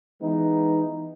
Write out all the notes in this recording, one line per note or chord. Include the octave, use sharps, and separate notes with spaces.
E3 G#3 B3 D#4